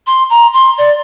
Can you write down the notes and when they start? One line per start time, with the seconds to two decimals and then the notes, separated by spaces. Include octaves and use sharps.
0.06 C6
0.29 A#5
0.53 C6
0.78 D5